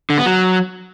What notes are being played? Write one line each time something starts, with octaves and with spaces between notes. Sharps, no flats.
D3
B3
F#3